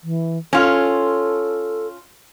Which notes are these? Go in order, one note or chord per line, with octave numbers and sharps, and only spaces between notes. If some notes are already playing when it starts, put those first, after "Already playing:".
E3
C#4 F4 A4